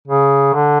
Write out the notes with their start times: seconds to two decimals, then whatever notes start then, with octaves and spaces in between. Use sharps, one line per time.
0.08 C#3
0.53 D3